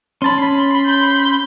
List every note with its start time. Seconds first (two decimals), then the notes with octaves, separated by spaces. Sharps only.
0.22 C#4 A5 B5 C6
0.86 G6